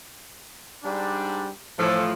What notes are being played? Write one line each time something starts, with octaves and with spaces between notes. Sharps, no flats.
G#2 G3 D4
A2 E3 F3 A4